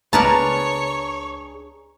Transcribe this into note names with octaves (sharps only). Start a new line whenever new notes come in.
C#2 D4 G#4 A#4 B4 C#5 A5 A#5